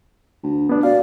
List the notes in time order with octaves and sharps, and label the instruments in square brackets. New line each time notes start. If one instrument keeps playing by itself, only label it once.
[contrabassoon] D2
[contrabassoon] G1 [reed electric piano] B3 D4
[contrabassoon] B2 [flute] D5 [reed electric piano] F5